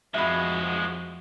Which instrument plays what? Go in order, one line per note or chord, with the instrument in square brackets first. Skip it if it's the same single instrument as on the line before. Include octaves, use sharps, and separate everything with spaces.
[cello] F2 F#4 [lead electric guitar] F3 G#3 [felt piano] E5 B5